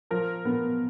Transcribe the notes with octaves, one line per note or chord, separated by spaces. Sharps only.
F3 A#4
B3